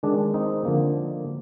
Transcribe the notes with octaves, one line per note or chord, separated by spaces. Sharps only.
D#3 G#3 D4
C4 D#4
D3 F3 A#3